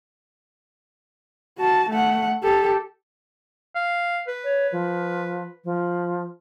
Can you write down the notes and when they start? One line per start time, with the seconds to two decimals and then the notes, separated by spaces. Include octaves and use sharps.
1.58 F#4 A5
1.90 A3 F#5
2.43 G4 A4
3.75 F5
4.28 B4
4.44 C#5
4.72 F3
5.64 F3